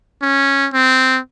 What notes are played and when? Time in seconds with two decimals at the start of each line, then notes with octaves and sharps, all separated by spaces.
0.22 C#4
0.74 C4